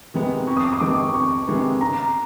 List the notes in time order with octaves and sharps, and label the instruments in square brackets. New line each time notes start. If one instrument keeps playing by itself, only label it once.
[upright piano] C3 D#3 G#3 B3
[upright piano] F2 [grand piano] C#6
[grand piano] D#6
D6
D#6
[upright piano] C3 D#3 G#3 B3 [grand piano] D6
[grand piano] C#6
[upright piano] F2 [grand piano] C#6
[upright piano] C3 D#3 G#3 B3
[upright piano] C#3 [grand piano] A#5